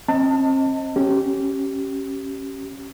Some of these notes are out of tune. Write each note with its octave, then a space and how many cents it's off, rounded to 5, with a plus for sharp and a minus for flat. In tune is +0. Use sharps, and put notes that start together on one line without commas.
C4 +40 D#5 +15 A5 +30
C#4 -15 G4 -25